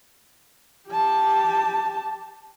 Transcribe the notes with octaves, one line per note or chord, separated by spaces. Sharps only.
G4 A5